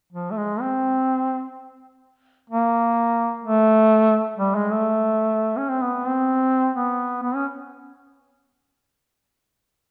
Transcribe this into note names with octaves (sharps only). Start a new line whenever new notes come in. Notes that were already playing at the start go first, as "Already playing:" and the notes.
F3
A3
G#3
C4
A#3
A3
G3
G#3
A3
C#4
C4
B3
C4
B3
B3
C#4